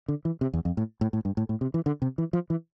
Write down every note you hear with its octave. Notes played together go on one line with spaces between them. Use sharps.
D3
E3
C3
E2
F2
A2
A2
A2
G2
A2
A2
C3
E3
D3
C3
E3
F3
E3